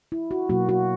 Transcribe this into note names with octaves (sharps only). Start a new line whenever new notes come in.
E4
F#4
B2 F#3 A#3 F#4
F#4